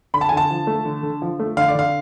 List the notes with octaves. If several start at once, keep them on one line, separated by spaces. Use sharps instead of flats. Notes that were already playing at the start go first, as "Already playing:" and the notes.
D3 B5
A5
G#5
D3 A5
F3
A3
D3
D3
F3
A3
D3 F5
D5
D3 F5